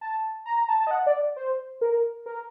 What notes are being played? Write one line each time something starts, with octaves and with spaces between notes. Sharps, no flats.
A5
A#5
A#5
A5
A5
D#5
F#5
D5
C5
A#4
A#4